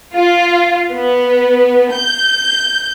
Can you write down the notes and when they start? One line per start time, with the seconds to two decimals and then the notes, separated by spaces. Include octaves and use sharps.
0.14 F4
0.92 B3
1.93 G6